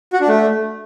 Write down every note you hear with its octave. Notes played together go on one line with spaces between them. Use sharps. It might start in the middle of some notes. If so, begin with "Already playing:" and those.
F#4
D4
A3